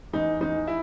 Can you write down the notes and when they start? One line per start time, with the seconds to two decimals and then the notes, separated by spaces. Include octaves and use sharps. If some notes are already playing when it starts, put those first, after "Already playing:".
0.13 E2 D#4
0.40 E2 D#4
0.67 E4